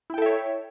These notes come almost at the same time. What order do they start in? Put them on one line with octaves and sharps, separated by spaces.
E4 G5 A4 E5 C#5